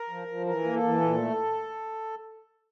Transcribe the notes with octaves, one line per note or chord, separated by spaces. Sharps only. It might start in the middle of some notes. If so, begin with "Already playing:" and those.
Already playing: A#4
F3
F3
E3 A#4
A#3
A4
E3
A#2
A3